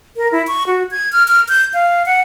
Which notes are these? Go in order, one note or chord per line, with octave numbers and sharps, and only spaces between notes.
A#4
E4
C#6
F#4
G#6
F6
F6
G6
F5
F#5